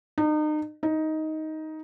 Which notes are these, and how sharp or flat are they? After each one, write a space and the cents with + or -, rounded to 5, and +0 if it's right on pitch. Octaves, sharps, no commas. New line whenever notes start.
D#4 -35
D#4 +10